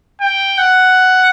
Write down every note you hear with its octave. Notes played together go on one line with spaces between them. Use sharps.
G5
F#5